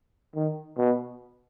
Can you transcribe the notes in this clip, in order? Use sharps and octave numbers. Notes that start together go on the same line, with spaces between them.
D#3
B2